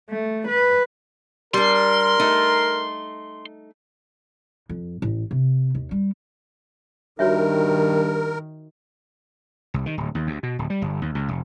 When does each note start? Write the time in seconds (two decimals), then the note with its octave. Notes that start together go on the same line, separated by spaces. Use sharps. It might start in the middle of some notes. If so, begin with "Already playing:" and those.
0.10 A3
0.48 B4
1.54 G3 D4 A#4 C6
2.20 A3 D#4
4.69 F2
5.02 A1
5.31 C3
5.75 D#2
5.91 G3
7.19 G2 D#3 F#4 A#4 C#5 E5
9.74 C2
9.86 D#3
9.97 D1
10.15 D#2
10.27 D2
10.43 B2
10.59 D1
10.70 G3
10.82 G1
11.02 D#2
11.15 C#2
11.28 F1